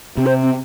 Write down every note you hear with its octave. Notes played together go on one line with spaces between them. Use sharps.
C3 C4
C5
C4